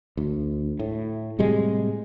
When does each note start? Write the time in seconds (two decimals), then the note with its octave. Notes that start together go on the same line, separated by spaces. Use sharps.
0.17 D2
0.79 A2
1.39 A2 C3 G3 G#3